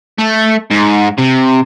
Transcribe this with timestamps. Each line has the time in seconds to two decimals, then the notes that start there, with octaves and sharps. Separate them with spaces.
0.19 A3
0.70 G#2
1.18 C3